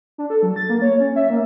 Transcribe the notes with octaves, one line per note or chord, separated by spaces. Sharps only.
D4
A4
F#3
A6
A#3
C#5
C#4
E5
A#3